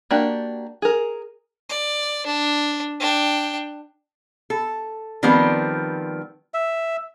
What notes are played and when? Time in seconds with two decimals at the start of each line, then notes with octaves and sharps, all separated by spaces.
0.11 A#3 D4 F#4 G4
0.82 G#4 A#4
1.69 D5
2.26 D4
3.00 D4 G5
4.50 A4
5.23 D#3 F3 G3 B3 C4
6.54 E5